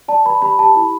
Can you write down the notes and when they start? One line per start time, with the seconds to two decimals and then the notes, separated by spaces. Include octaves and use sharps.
0.08 D5 A5
0.25 B4 B5
0.42 G4 B5
0.59 G4 A5
0.76 E4 B5